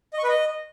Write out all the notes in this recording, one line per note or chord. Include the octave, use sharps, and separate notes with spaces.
D#5
C#6
B4
D#5